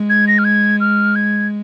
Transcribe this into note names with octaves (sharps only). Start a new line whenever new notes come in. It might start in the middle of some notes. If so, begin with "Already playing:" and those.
Already playing: G#3
G#6
A#6
F6
G#6
F6
G#6